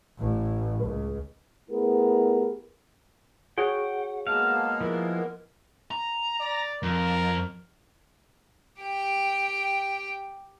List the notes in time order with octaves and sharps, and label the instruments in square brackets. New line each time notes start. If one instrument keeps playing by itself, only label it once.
[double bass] A1 A2
C#2
[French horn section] A3 B3 E4 G4 G#4 A#4
[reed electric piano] F#4 G#4 C#5 [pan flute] F#5 [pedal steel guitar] G5
[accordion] G#3 A#3 B3 [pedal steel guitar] F5 [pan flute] A5
[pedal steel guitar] F3 E4 [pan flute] A#4
[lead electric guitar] A#5
[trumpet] D5
[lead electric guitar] F2 [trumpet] A#4
[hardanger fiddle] G4 G5